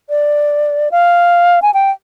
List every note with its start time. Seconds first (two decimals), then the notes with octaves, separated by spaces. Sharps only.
0.10 D5
0.91 F5
1.62 G#5
1.74 G5